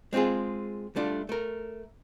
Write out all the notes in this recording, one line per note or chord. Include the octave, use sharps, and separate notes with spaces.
G#3 C4 C#4 F4 G#4
G3 A3 D4 F4
A3 A#4